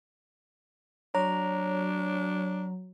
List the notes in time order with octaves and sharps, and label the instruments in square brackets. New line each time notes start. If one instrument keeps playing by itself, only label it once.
[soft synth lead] F#3 [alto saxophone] D4 [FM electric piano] C#5 [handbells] A#5